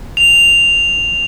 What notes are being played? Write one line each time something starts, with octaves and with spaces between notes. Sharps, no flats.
F7